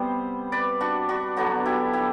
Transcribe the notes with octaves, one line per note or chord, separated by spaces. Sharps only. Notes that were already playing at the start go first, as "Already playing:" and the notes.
Already playing: C3 G3 B3 C5
B4 D5
D4 F#4
D4 F#4
D3 F#3 B3 D4 F#4
E4 G4
E4 G4